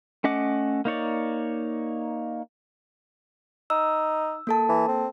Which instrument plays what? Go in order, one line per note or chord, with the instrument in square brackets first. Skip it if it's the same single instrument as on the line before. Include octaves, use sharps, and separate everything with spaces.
[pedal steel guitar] A3 C#4 D#5 F#5 D6
A#3 D#4 C#5 D5
[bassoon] D#4 [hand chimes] E6
[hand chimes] A#3 A4 A5
[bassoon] E3
C4